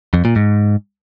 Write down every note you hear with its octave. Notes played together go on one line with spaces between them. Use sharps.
F2
A#2
G#2